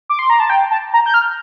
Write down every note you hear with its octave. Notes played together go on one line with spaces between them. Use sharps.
D6
C6
A#5
A5
G5
A5
A#5
G6
F6